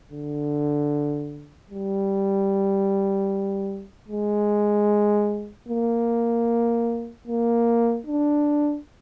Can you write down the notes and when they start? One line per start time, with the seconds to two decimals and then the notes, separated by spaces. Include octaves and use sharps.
0.11 D3
1.71 G3
4.08 G#3
5.68 A#3
7.27 A#3
8.07 D4